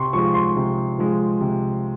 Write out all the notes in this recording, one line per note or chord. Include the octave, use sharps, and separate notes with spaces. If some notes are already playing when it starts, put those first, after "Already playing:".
Already playing: C3 C6 C#6
F3 G#3 C#6
C6
C3
F3 G#3
C3